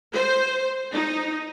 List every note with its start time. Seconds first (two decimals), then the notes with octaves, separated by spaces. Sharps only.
0.14 C5
0.92 D#4